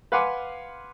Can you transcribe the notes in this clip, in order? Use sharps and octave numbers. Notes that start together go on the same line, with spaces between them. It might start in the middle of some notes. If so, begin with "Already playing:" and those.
B4 F5 F#5 G#5 C6 D6